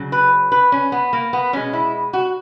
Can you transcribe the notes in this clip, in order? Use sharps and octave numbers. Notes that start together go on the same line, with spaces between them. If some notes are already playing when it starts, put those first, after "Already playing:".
Already playing: C#3 F#3
B4
B4
C#4
B3
A#3
B3
B2 G#3 C#4
E4
F#4